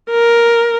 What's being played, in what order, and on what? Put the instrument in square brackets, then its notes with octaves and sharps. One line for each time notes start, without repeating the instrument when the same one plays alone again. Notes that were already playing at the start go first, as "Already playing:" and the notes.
[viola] A#4